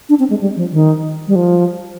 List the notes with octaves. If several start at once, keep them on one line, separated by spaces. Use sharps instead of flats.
D4
C4
G#3
G3
F3
D#3
G3
F3